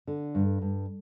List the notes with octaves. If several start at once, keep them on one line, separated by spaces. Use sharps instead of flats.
D3
G2
G2